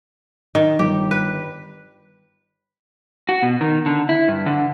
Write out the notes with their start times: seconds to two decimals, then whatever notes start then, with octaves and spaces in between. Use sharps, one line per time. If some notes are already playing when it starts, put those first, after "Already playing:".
0.55 D#3
0.79 G1 G4
1.11 B4
3.29 F#4
3.42 B2
3.61 D#3
3.86 D3
4.09 E4
4.28 G2
4.46 D3